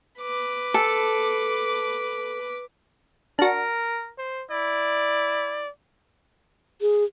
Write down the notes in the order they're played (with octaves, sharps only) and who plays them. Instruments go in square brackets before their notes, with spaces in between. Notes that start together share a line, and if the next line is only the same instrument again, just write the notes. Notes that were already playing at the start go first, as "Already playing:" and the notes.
[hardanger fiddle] B4 D6
[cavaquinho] A4
[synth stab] D4 F#4 [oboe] A#4
[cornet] C5
[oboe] E4 [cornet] D5
[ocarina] G#4